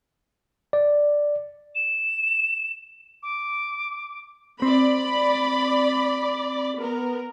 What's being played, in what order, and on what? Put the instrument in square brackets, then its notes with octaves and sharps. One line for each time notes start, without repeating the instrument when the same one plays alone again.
[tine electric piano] D5
[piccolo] E7
D6
[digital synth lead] C4 [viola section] D5 B5
[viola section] B3 A#4